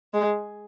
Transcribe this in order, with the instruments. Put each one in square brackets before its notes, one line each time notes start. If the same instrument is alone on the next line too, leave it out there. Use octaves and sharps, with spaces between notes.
[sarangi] G#3